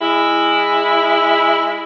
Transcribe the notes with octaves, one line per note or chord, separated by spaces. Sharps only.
G#3 E4